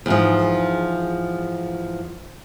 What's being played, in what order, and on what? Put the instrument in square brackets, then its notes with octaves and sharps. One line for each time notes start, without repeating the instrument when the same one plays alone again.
[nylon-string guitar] E2 G#2 F3